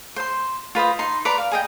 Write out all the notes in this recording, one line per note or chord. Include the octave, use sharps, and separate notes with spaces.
C5 C6
F4 B4 C5 D#5
D#4 C6
B4 D5 A#5 C6
F5
G#4 D#5 G5